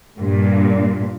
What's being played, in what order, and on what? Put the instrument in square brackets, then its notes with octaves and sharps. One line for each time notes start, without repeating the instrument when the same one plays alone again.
[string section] G2 A#2